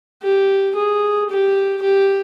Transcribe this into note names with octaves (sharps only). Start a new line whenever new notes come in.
G4
G#4
G4
G4